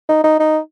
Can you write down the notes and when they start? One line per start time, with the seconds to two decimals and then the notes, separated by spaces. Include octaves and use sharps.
0.09 D#4
0.24 D#4
0.39 D#4